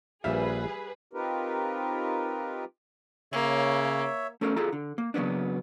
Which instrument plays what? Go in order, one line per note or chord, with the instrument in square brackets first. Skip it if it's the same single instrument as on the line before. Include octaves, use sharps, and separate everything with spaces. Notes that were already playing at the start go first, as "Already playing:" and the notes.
[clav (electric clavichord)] A#1 F5 [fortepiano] G3 E5 [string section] G#4 B4
[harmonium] C4 D#4 F4 G4 A#4 B4
[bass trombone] C#3 [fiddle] A#3 [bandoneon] C#5 E5
[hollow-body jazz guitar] A3 C#4 A4 A#4 C#5 F5
F4 G#4 A4 F5 A#5
D3
A#3
C#3 F#3 A#3 B3 D4